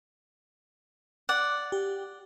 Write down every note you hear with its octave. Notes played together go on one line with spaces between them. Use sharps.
D5 F#5
G4